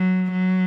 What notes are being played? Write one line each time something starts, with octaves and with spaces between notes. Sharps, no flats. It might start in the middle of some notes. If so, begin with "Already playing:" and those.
Already playing: F#3
F#3